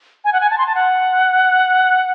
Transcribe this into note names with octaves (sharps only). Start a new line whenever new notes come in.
G#5
F#5
G#5
A5
C6
A5
F#5